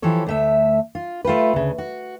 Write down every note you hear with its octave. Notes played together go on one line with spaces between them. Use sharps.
E3 F3 G4 A4 C#5
D2 A3 E5
F4
A3 F4 G4 B4
D2 C#3
F#4